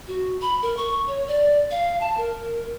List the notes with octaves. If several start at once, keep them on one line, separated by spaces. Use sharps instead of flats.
F#4
B5
A#4
C#6
C#5
D5
F5
A5
A#4